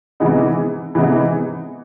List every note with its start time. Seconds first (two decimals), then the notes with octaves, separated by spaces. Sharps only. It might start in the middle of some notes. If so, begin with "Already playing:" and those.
0.20 C3 E3 G#3 B3 D#4
0.95 C3 E3 G#3 B3 D#4